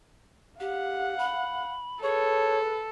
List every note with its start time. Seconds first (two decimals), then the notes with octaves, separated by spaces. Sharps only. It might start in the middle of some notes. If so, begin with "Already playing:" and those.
0.60 G4 F5 F#5
1.18 B5
2.02 G#4 A4 B4 C#5